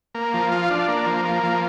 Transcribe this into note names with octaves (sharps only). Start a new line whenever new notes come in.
A#3
F3
F4
D4
A#3
F3
A#3
F3